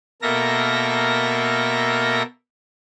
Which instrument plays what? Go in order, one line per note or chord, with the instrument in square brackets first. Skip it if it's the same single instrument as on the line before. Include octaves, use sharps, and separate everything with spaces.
[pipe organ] B2 A#3 A4 A#4 E5 A#6